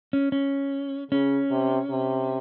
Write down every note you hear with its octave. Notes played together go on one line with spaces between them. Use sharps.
C#4
C#4
C#3 C#4
C3
C3